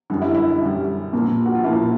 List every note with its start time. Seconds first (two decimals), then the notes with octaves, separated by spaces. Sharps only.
0.10 F#2 D3 G3
0.22 E4
0.35 E4
0.48 E4
0.61 F#2 D3 G3
1.13 A#2 F3 A#3
1.46 F#4
1.55 F4
1.64 A#2 F3 A#3 E4